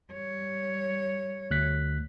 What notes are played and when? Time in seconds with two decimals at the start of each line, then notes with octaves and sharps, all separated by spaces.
0.13 G3 C#5
1.51 D2 F#6 B6